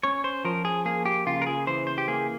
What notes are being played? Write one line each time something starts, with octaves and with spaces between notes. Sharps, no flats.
C#4 C#5
C5
F3 A#4
G#4
A#3 G#4
G4
C#3 F4
A#4
G#4
E3 C5
C5
G4
A#3 G#4